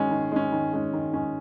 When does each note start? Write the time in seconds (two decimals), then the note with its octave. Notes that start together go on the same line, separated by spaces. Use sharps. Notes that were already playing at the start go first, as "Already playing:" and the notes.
Already playing: D#3 G#3 C#4
0.11 D#3
0.32 G#3 C#4
0.52 D#3
0.73 G#3 C#4
0.93 D#3
1.13 G#3 C#4